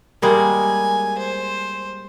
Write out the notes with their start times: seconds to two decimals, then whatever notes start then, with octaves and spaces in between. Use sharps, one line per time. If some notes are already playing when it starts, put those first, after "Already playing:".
0.22 G3 G#3 A#3 G#5
1.18 C5